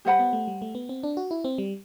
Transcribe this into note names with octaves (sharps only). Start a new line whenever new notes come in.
G3 G4 C5 F#5 B5
B3
A3
G3
A3
B3
C4
D4
F#4
E4
C4
G3